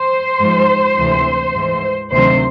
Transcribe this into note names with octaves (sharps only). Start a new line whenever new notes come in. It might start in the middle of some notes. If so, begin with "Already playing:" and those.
Already playing: C5
G#2 F3
D2 C3 E3
G#2 E3
D2 C3 D#3 F#3 C5